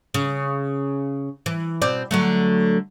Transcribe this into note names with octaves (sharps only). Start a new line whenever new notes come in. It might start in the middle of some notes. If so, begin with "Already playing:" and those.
C#3
E3
B2 C4 D5
D3 F#3 A3